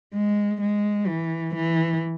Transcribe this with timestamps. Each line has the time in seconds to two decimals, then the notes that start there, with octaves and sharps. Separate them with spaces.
0.14 G#3
0.61 G#3
1.08 E3
1.55 E3